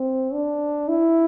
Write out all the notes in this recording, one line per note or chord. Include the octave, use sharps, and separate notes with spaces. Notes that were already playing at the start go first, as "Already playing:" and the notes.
Already playing: C4
D4
E4